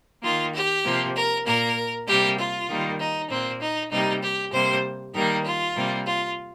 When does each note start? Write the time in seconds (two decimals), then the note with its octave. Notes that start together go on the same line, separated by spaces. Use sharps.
0.23 D#3 A#3 F4
0.53 G4
0.84 C3 F3 A#3
1.15 A#4
1.46 A#2 A#3 A#4
2.07 C3 G3 A#3 G4
2.37 F4
2.68 D#3 G3 A#3
2.99 D#4
3.29 A#2 A#3 C4
3.60 D#4
3.91 C3 G3 A#3 D#4
4.22 G4
4.52 C3 G3 A#3 C5
5.13 D#3 G3 A#3 A#4
5.44 F4
5.75 C3 G3 A#3
6.06 F4